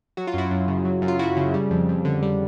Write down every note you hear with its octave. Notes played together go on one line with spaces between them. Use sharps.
F#3 F#4
F4
F#2 E4 F#4
F#2
C#3
F#3
F#2
F4
F#2 E4 F#4
C#3
G3
F2
F2
D3
G3